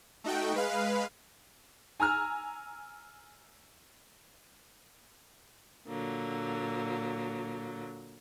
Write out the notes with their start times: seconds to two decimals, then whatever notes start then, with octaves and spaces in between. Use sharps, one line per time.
0.24 A3 D#4 F#4 G5
0.54 G#3 B4 F5
2.00 G#5 A#5 E6 F6
5.88 A#2 D3 F#3 A#3